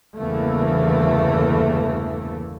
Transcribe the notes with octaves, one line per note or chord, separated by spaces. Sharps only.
G1 E2 C#3 E3 A3 A#3